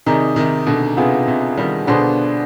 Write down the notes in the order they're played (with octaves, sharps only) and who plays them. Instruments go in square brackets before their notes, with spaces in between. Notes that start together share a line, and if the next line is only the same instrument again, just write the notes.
[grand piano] C3 D#3 [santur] D#4 G#4 D5
[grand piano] C3 D#3
B2 D3
[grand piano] C3 [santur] B3 F4 G#4
[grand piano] C3
D#3 G3
[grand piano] B2 D3 [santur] B3 D4 G#4 C5